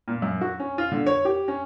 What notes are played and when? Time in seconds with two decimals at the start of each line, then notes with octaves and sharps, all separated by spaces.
0.08 A#2
0.22 F#2
0.41 F#4
0.60 C#4
0.78 F4
0.92 D3
1.07 C#5
1.25 G4
1.48 C#4